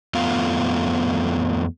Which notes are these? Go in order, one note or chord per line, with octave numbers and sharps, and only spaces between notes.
F2 A3 B3 F4 F5